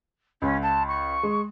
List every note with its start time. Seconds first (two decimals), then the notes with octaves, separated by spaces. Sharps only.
0.42 C#2 C#4
0.62 A5
0.87 C#6
1.23 G#3